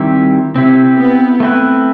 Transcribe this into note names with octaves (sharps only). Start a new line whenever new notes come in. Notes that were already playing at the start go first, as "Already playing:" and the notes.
Already playing: D#3 G3 C4 E4 G4
C3 C4 E4 G4
B3
A3 C4 E4 B4